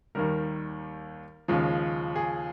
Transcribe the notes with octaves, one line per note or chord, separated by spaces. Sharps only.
D#2 D#3 G3 A#4
D#2 C#3 F3 G#3
G#4